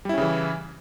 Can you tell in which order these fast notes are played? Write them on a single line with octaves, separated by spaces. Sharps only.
G3 E4 C#4 C#3 E3